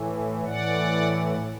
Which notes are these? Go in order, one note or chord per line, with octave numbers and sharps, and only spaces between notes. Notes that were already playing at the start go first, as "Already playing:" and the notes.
Already playing: A2 E3
A2 E3 D5 F#5